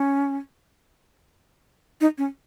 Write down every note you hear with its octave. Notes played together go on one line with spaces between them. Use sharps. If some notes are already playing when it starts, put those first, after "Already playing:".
Already playing: C#4
D#4
C#4